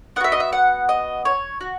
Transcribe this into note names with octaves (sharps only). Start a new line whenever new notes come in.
B3 F#4 E5 F#5
D#5
E5
F#5
D#5
C#5
F#4